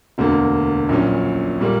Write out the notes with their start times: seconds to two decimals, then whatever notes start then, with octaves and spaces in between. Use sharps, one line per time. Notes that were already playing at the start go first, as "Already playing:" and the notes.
0.18 E1 D2 D3 A#3
0.89 A#1 A#2 F#3 C#4
1.60 A#2 G3 A#3